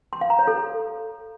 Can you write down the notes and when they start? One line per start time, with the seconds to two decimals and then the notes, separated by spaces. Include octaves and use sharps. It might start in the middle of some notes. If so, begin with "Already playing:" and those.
0.13 C6
0.21 F5
0.30 A#5
0.39 C#5
0.47 A4